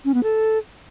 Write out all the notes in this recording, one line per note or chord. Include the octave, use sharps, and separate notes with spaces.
C#4
B3
A4